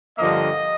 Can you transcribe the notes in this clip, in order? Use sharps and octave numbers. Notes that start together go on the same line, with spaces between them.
G2 D3 F3 A#3 D#5